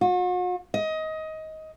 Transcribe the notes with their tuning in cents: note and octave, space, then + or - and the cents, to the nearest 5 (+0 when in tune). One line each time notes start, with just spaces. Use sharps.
F#4 -45
D#5 +20